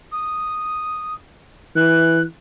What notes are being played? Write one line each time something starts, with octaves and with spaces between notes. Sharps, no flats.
D#6
E3 F#6